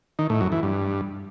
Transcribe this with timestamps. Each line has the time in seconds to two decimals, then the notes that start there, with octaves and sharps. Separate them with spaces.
0.19 D#3
0.30 A2
0.41 F#2
0.52 E3
0.63 G2